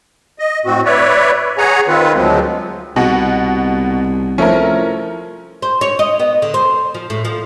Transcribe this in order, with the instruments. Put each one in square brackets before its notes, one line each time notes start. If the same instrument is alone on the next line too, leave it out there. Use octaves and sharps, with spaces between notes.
[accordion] D#5
A2 C4 F#4
B4 C#5 D5 E5
G#4 C#5 F#5 G#5 A#5
D#3 C4 F4 B4
D2 F3 F#3 G#3 C4
[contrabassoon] C2 [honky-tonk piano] B2 F#4
[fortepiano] F3 A3 E4 [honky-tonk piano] C#4 A#4
[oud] C5
C#5
D#5
B3
D3
C5
F3
A2
F3